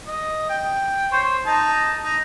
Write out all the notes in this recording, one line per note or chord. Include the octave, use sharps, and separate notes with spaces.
D#5
G5
C5 C#5
D#4 A5
D#4